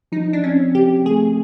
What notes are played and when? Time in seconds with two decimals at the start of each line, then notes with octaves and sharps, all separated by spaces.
0.12 F3 D#4
0.33 D4
0.43 C4 C#4
0.74 C#3 G4
1.05 A3 G#4